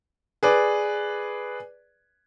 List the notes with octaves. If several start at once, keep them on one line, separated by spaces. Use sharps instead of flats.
G#4 B4 D5